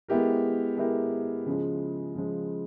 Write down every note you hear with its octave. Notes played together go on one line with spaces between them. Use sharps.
G#3 B3 E4 G4 A#4
G#3 B3 E4 G4 A#4
C#3 F3 G#3
C#3 F3 G#3